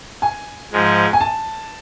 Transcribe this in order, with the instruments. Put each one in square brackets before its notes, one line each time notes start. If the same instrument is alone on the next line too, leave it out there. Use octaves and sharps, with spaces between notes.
[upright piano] G#5
[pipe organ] G#2 F3 G#3
[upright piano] G#5
A5